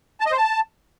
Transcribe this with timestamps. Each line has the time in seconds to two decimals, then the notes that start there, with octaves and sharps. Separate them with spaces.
0.21 A5
0.26 D#5
0.32 C5
0.37 A5